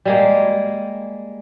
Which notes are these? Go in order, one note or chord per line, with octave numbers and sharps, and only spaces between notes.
G3 G#3 A#3